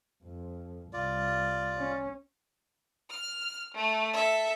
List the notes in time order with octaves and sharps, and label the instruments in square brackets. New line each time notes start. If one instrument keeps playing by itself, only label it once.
[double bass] F2
[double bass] C2 [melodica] F4 D5
[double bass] C#4
[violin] F6
A3
A4 E5